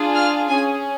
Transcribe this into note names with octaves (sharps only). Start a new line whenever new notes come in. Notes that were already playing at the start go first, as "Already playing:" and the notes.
Already playing: D4 F4 G#4
F6
C#4 G#4 G#5